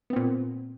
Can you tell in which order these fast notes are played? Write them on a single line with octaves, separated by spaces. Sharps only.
B3 C4 A#2